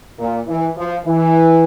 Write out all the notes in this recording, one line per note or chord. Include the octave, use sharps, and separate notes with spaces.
A#2
E3
F3
E3